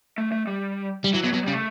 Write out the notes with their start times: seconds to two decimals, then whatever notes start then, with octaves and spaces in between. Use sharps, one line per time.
0.18 A3
0.32 A3
0.47 G3
1.04 G3
1.13 E3 F#3
1.23 B2 F#3
1.33 B2 F#3
1.43 C#3 G3
1.53 A3